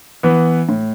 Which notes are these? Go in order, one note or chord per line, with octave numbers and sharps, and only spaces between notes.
E3 B3
A2